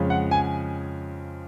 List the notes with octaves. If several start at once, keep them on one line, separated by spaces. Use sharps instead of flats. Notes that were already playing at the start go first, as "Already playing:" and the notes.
Already playing: F2 C#3 G#3 C#4
F#5
G#5